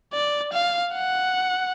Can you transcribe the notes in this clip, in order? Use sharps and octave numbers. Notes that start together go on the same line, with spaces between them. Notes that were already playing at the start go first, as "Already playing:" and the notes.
D5
F5
F#5